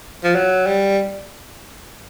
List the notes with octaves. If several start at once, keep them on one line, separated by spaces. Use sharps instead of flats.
F3
F#3
G3